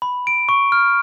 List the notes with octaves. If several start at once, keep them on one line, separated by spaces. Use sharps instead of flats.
B5
D7
C#6
F6